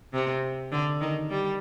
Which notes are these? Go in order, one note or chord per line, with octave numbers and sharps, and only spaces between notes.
C3
D3
D#3
G3